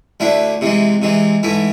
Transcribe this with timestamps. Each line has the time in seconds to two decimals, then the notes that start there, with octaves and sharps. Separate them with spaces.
0.20 D2 D3 A3 E4
0.61 C3 E3 G#3
1.02 C3 E3 G#3
1.43 G#2 E3 A3 E4